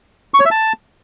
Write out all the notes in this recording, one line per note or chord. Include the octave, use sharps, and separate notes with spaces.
C#6
C#5
E5
A5